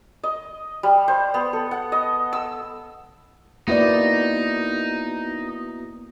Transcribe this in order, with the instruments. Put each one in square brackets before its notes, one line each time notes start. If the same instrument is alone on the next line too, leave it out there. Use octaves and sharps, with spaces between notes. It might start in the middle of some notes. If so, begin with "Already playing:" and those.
[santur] D#5
G3
C5
B3
A4
F#5
D#5
E6
[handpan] A#3 D5 [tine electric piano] B3 E4 F#4 [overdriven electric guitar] D#4